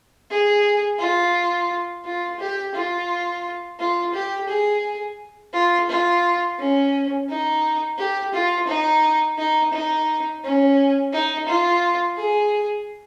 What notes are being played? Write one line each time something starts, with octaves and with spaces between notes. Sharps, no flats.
G#4
F4
F4
G4
F4
F4
G4
G#4
F4
F4
C#4
D#4
G4
F4
D#4
D#4
D#4
C#4
D#4
F4
G#4